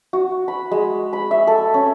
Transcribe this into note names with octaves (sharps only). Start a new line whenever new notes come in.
F#4
B5
G#3
B5
E5
A4
C#4